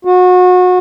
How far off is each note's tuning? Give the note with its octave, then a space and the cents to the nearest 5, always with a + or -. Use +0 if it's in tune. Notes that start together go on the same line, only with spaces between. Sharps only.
F#4 -30